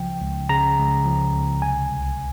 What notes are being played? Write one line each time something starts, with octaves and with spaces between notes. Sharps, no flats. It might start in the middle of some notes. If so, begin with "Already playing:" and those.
Already playing: C#2 C#3 F3 G5
C#2
C#3 A#5
C#2
F3
C#2
C3 G#5
C2